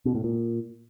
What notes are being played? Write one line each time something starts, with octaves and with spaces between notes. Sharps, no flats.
B2
A2
A#2